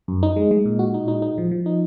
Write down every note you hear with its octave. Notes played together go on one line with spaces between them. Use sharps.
F#2
D#4
G#3
G#3
A#2
F#4
D#4
D#4
D#4
F3
F3
D#4